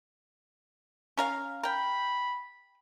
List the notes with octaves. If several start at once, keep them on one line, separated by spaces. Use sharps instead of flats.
C#4 A#4 F5
A#4 G5 B5